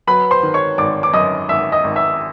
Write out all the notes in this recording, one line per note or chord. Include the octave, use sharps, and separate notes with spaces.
F#3 B4 B5
C5 C6
D#3
C#5 C#6
G#1 D5 D6
D6
F#2 D#5 D#6
G#1 E5 E6
D#5 D#6
G#1
E5 E6